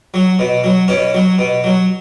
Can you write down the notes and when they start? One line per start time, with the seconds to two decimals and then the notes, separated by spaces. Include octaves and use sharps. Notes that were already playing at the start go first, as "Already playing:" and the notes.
0.14 F#3
0.39 B2
0.64 F#3
0.88 B2 C#4
1.14 F#3
1.39 B2
1.64 F#3